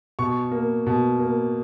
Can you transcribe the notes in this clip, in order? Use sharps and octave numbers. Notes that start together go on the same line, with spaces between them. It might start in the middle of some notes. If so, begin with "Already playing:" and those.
B2 C#6
A#3
B2
A#3